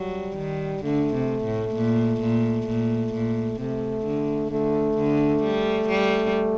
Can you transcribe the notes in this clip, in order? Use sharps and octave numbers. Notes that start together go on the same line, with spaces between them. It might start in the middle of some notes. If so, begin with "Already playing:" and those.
Already playing: F#3 G3
D#3
D3 A3
C3
A2
A#2
A#2
A#2
A#2
C3 A3
D3
D3 A3
D3
G3
G3